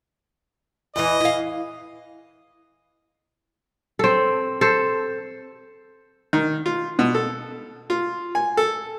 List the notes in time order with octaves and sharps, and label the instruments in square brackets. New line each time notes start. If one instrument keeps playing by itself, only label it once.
[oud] E2 E3 [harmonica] D#5
[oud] E4 F5
[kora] C4 A4
A4 C5
[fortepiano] D#3
F4
B2
A4
F4
G#5
A4